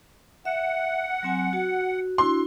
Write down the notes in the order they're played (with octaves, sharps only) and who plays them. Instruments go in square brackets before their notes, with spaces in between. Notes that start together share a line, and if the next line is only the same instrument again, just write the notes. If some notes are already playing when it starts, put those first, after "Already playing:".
[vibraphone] E5 [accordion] F#5
[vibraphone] F#3 C4 G#5
F#4
[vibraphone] D4 E4 F#4 [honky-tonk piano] C6